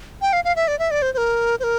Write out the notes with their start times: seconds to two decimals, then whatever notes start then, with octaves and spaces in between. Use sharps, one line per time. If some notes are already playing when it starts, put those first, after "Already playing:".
0.22 G5
0.33 F5
0.45 F5
0.56 E5
0.68 D5
0.79 E5
0.91 D5
1.02 C5
1.14 C5
1.18 A#4
1.60 C5
1.64 A#4